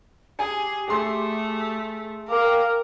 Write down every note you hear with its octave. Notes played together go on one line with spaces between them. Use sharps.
G4 G#4 G#5
A3 G#4 C6
A#4 F5 G5 D6